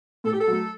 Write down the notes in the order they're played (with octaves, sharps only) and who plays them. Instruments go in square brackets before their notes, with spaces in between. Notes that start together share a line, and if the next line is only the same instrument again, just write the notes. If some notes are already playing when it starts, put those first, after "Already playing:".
[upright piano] A2 [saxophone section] A4
[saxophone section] G4
A4
[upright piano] F#3 A3